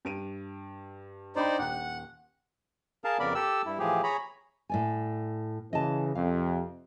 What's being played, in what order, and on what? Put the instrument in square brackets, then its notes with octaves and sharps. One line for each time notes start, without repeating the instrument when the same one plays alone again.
[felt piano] G2 D7 D#7
[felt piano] D4 G5 B5 [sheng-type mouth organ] D#4 C5 D5
[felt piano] D#1 G5 F#6 [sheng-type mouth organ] F#5
[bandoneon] G#4 A#4 F5 A5
F2 C#3 B3 A#4 D5 B5
G4 A4 E6
G2 E4
A2 E3 F3 G4 G#4
G#4 C#5 A#5 B5
[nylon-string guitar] A2 D5 G#5
[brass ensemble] C#3 E3 [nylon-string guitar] D#5 A5
[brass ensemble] F2 C3 [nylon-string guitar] F5